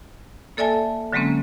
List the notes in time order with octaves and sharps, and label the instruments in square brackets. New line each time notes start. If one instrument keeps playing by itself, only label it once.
[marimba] A#3 A4 D5 E5 G#5 A5
D3 F#3 G#3 A#3 C4 C#4